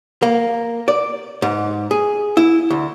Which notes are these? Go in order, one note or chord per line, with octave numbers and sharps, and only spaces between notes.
A#3
D5
G#2
G#4
E4
D2